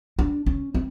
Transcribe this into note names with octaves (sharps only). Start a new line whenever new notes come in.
D4
C#4
C4